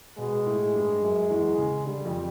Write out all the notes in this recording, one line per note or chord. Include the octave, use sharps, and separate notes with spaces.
B2 G#3 B3
A2 A3
G2 G3
F#2 F#3
E2 E3
C#3
D3 G3
F2 F3